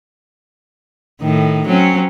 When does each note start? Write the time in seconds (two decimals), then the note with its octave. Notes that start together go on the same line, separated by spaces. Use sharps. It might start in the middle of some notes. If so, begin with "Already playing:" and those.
1.22 A2 D#3
1.68 F#3 C4 C#4